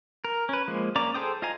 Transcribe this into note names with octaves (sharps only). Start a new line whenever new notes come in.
A#4
C#4 B4
F3 G#3 A#3
A#3 C#4 D5 A#5 D6
G#4 A4 C5 G5 D#6
F4 D#5 F5 G#5 A#5